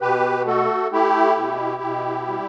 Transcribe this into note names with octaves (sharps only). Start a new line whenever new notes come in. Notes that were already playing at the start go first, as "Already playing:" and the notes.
B2 G4 B4
A3 F#4 A4
A3 E4 G4
B2
B2
G3